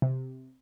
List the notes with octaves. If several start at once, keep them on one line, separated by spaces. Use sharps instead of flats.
C3